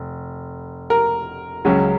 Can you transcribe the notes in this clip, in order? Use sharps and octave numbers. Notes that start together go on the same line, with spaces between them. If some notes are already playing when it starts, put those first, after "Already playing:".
Already playing: F1
A#4
C#2 C#3 F#3 C#4